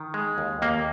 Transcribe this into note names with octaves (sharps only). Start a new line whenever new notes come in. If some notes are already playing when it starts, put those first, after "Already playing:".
Already playing: D#3
G#3
D#2
D#2 A#3